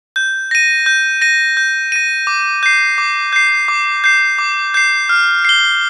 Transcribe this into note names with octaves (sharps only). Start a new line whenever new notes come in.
G6
A#6 D#7
G6
A#6 D#7
G6
A#6 D#7
D6
G6 C7
D6
G6 C7
D6
G6 C7
D6
G6 C7
F6
C7 G7